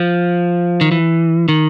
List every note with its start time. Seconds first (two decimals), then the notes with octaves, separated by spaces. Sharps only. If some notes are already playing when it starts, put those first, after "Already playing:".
Already playing: F3
0.81 D#3
0.92 E3
1.49 D#3